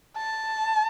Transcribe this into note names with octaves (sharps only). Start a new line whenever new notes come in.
A5